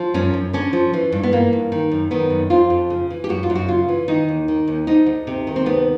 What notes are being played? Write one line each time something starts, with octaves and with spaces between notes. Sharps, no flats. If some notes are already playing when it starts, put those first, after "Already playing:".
Already playing: F3
F#2 C#4
F#2
D3 C#4
F3
E3
G2
B3
E3 A#3
G2
D#3
F#2
D#3 B3
F#2
F2 F4
F2
C#3
E3
G4
F#2 F#4
F4
F#2
F#4
C#3 F4
E3
D#3 D#4
D#2
D#3
D#2
D2 D#4
D2
C3
D#3
C4
D2 B3